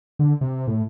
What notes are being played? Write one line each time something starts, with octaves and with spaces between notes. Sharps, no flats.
D3
C3
A2